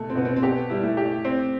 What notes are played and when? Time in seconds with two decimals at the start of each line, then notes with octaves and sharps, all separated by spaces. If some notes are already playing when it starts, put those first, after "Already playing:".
Already playing: B2 A3
0.10 C4
0.15 B2 B3
0.25 C4
0.36 C4
0.42 B3 G4
0.70 G3 E4
0.83 A3
0.97 G4
1.25 C4